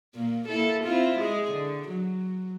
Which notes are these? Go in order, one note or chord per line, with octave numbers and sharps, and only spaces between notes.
A#2 A#3
A#3 E4 A4
C4 E4 F4
G#3 G#4
D3
F#3